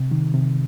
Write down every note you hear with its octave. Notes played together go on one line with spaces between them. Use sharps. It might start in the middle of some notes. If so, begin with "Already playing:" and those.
Already playing: C3
D#3
C3